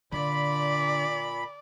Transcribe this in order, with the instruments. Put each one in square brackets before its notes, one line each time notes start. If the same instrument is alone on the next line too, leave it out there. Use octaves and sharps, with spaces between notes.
[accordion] A#2 B5 [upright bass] D3 [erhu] D5